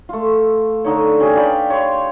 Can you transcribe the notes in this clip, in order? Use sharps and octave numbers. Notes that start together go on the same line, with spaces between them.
A3 F4
D3 D#4 C#5
C#4 G4 G#4
B4 D5 F5 G5
C#5 C6